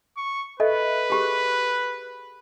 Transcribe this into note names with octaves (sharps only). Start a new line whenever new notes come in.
C#6
A4 B4 D#5 E5
G4 G#4